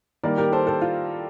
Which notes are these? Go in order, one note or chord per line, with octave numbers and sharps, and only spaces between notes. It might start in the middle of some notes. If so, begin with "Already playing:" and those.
D#3 G3 A#3 A#4 D5
G4 A#4
A4 C5
A4 C5
F4